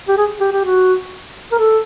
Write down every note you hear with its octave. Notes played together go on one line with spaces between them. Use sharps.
G4
G#4
G4
G4
F#4
A#4
A4